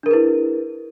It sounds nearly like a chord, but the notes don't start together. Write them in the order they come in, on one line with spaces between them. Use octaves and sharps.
D4 A#4 G#4 B4 E4